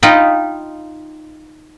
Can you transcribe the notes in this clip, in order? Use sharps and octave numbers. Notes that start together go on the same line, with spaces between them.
D#4 F4 D#5 G5 B5